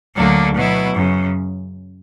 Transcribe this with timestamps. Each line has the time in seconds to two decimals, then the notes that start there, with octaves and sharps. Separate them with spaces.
0.16 D2 D3 F#3 A#3 D4
0.55 B2 F#3 B3 E4
0.95 F#2 C#3